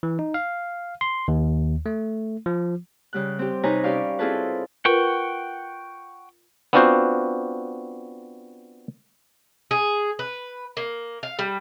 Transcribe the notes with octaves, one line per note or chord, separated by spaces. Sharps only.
E3
D#4
F5
C6
D#2
A3
F3
C#3 G3 F#6
C4 G4
C3 D#4 B4 C#5 G#5 A#5
C#4 G4 D5 F5 C#6
C4 E4 F4 G#4 A4 B4
F4 A#4 B4 F#5 G5 C#6
B3 C4 D4 F4 F#4 C5
G#4
B4
A#3
F5
G3